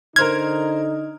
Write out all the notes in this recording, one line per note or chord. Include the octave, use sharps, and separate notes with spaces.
D3 D#4 A#4 C5 F6 G#6